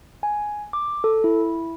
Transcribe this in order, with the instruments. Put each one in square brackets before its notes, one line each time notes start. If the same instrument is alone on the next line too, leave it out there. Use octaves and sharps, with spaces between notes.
[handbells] G#5
D6
A4
E4